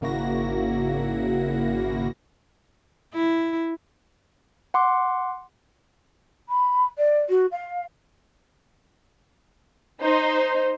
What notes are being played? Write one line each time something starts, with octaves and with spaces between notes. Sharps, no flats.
G#1 C#3 A#3 E4 F#4 A#6
E4
F#5 C6 D6
B5
D5
F#4
F5
D#4 C5